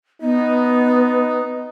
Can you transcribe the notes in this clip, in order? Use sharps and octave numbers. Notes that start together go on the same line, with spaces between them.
B3 D#4